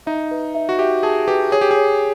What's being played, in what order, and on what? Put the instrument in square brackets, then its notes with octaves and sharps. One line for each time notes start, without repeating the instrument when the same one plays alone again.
[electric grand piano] D#4 [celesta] E5
[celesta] B4
E5
[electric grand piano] F#4
[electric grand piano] G4 [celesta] E5
[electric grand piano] G#4 [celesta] A5
[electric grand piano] G4 [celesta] B4
[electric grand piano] G#4 [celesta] C#5
[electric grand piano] G4
G#4
[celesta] C#5